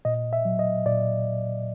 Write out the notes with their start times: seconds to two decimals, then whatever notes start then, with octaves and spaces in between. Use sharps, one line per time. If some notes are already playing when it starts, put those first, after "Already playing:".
0.05 A#2 D#5
0.33 E5
0.45 F#3
0.59 D#5
0.86 A#2 D5